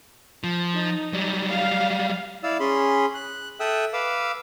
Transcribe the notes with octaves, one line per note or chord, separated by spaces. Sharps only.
F3
D#4
F#3 G3
F5
E4 D5 F5 E6
C#4 G#4 B5 C6
F#6
A4 E5 G5 D#6 E6 F#6
B4 F5 D6 E6